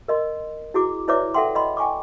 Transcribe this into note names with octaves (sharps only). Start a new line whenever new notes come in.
A#4 D#5 C6
E4 F#4 G#4 D6
E4 B4 C#5 D5 E5 D6
A4 E5 F#5 G5 C6
D#5 B5 C6
G5 G#5 C#6 D6